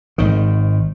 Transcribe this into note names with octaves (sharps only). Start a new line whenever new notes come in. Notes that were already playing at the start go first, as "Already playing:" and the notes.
G#1 D#3